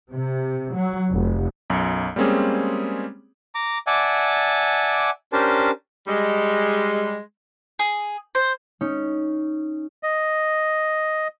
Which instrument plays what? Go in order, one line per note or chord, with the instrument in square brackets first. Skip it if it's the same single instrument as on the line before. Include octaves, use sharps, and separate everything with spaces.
[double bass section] C3
F#3
F1
[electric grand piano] B1 F#2
G3 G#3 A#3 C4 C#4 G#4
[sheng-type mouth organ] A#5 D6
D5 E5 F#5 G#5 A5 D6
C#4 D4 G4 A#4 C5 A5
[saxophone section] G3 G#3
[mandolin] G#4
C5
[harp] C#4 D#4
[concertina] D#5